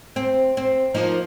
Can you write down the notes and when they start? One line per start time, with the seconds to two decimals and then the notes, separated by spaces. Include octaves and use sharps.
0.16 C4
0.57 C4
0.94 F3 A#3 D#4